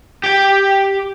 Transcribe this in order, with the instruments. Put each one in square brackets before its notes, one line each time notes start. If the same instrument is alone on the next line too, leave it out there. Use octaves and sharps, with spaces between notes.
[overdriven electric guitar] G4 G5